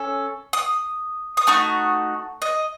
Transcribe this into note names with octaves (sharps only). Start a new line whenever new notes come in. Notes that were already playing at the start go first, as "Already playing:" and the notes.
Already playing: C#4 A4
D#6
D#6
A3 D#4 F#4 C#6
D#5